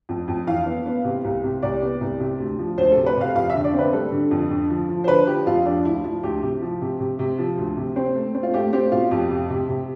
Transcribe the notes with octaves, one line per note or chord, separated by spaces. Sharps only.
F2
F2
E3 F5
B3
B3
C3
C2
C3
C2 D5
B3
C2
C3
D2
F3
D2 C5
C3 A4
B4
C3 F5
F2 F5
E5
D3
D5
C4
B4
G3 A4
D3
F2
D3
F3
F3
C5
D3 B4
F3 G4
F2 F4
F3 D4
D2 E4
F3 E4
D2 G4
C3
F3
C3
C3
C3
F3
D2
C3
C4
A3
C4
F4
A3 G4
C4 G4
B2 F4
F2 G4
C3
C3
C3